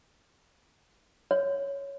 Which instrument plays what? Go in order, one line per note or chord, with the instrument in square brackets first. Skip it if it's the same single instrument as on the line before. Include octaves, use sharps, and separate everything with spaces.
[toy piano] C#5